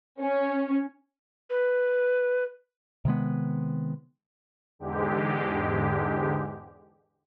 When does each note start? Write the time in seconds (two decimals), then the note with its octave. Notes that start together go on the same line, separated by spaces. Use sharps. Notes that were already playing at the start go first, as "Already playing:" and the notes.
0.20 C#4
1.50 B4
3.05 C3 D#3 G#3 B3
4.79 E2 G#2 D3 G#3 G4